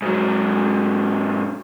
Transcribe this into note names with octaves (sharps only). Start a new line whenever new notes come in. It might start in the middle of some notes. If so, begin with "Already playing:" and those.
G#2 F#3